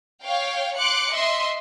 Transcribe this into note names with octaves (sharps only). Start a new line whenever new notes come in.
C#5 F5 G5
C6 D6 F#6 C#7
D#5 E5 C6